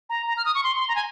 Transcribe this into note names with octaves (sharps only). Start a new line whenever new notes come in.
A#5
A#5
F6
D#6
C#6
C6
C6
A#5
G#5